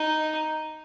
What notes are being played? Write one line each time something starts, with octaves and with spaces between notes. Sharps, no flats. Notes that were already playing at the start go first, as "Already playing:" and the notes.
Already playing: D#4